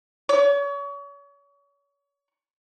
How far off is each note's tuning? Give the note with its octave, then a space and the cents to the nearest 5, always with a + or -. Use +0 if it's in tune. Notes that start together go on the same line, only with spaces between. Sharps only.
C#5 +35